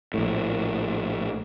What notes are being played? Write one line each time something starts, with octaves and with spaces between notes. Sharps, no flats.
A#1 A2